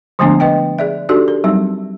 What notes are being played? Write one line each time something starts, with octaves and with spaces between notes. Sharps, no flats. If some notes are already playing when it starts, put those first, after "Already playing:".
D3 F3 G#3 A3 B3 D4
B4 D#5 G5
G#4 D5 E5
D4 D#4 F#4 G4 A4 D5
A#4
F#3 G3 C4 D#4